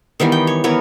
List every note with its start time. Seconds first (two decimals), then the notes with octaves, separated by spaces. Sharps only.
0.20 D#3 E3 G3 B3
0.32 G5
0.47 C#5
0.64 E3 B3 A#4 C#5